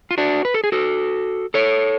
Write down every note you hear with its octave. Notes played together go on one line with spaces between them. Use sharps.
F4
D4 F#4
B4
A4
G#4
F#4 A4
A4 C#5